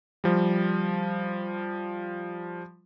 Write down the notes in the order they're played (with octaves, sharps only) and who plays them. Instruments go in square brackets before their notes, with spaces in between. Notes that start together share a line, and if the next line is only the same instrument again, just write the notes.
[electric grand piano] F3 G3